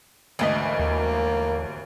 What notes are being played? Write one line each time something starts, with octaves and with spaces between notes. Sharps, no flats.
G#1 D2 E3 A3 D#5 B6
D#2 A#3